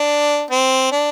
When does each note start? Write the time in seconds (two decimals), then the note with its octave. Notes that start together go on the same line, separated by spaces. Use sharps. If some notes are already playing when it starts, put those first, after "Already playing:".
Already playing: D4
0.51 C4
0.92 D4